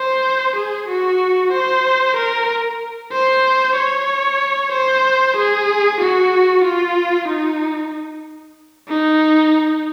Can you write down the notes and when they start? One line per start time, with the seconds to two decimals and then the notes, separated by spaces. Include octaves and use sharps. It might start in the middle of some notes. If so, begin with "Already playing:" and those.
Already playing: C5
0.56 G#4
0.89 F#4
1.53 C5
2.17 A#4
3.13 C5
3.76 C#5
4.72 C5
5.37 G#4
6.01 F#4
6.65 F4
7.28 D#4
8.89 D#4